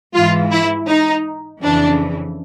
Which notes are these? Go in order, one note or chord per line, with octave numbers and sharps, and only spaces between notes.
G#2 E3 F4
E4
D#4
F2 C#3 E3 D4